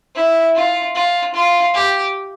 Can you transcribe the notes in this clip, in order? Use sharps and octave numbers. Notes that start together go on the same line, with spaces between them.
E4
F4
F4
F4
G4